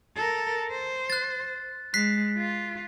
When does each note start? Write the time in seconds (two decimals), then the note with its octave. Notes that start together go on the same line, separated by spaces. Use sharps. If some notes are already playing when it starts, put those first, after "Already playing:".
0.16 A4 A#4
0.70 C5
1.10 F#6 A6
1.94 G#3 F#6 B6 C7
2.37 F4